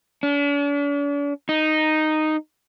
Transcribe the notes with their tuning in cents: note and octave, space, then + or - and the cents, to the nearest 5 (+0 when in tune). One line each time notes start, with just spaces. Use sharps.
D4 -45
D#4 -5